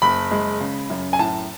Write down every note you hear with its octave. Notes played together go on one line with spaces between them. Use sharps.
F#1 B5
G#3
C#3
F#2
G#5
A2 A5